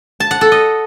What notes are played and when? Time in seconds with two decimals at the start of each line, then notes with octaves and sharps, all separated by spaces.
0.20 A5
0.31 F#5
0.41 A4
0.52 D#5